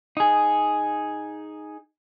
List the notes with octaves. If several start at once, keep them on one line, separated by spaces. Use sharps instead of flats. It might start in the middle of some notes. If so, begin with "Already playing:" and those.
D#4 G#4